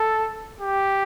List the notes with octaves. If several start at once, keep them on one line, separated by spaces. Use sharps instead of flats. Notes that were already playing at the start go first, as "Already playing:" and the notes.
Already playing: A4
G4